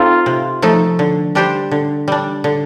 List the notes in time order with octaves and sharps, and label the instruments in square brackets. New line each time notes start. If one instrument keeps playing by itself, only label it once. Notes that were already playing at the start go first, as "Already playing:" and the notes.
Already playing: [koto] C4 D#4 A4 [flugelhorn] F4
[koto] C3
F3 A3 D#4 A4
D3
G3 D4 G4 C5
D3
G3 D4
D3